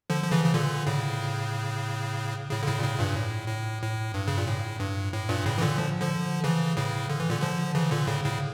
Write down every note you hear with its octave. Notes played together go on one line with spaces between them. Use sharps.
D3 F3
F3
C#3 E3
C#3
A#2 D3
A2 C#3
A2 C#3
D3
A2 C#3
A#2
A2 C#3
G2 A#2
A2
A2
A2
G2
C#3
A#2
A2
G2
A2
G2 A#2
A2 C#3
E3
A#2 D3
F3
D3 F3
C#3 E3
A2 C#3
D3
E3
A#2 D3
D3 F3
C#3 E3
A#2 D3
A2 C#3
A2 C#3